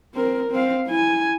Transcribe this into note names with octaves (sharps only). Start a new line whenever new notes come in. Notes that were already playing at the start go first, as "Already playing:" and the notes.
C4 A#4
C4 F5
E4 G#5